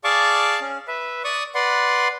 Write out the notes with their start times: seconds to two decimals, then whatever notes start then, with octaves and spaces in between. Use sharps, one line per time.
0.04 G#4 D5 F5 A5 C#6 D6
0.61 C#4
0.88 B4 E5
1.24 D5 C#6 D#6
1.55 B4 D5 F#5 C6